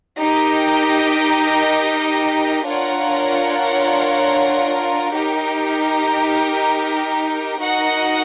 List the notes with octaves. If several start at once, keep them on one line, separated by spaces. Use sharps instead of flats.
D#4 G4 A#4 D#5
D4 F4 A#4 C#5 F#5
D#4 G4 A#4
D#4 F#4 A#4 D#5 F#5